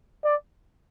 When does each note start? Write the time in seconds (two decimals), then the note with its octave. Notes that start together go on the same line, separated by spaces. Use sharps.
0.24 D5